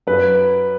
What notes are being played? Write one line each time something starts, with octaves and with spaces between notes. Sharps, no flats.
F#2 B4